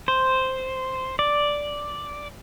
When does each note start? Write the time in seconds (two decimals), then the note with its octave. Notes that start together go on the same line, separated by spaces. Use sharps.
0.08 C5
1.19 D5